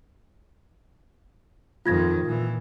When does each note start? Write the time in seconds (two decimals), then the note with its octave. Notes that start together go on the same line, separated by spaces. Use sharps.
1.86 F2 D#3 F4 G#6 A#6
2.25 A#2 E3